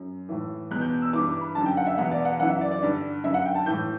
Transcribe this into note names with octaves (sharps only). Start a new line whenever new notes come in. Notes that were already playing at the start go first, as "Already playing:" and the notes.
Already playing: F#2
A2 E3
E2 B2 F#6
G6
E6
G2 E3 D6
D6
B5
F#2 D3 A5
G5
F#5
E5
E2 B2 F#5
D5
F#5
F#2 E3 F#5
E5
D5
D5
G2 D3
F#2 D3 E5
F#5
G5
A5
A2 E3 G6